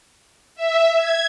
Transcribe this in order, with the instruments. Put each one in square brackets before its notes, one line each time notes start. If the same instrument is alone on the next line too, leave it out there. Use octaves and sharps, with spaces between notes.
[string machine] E5
G#6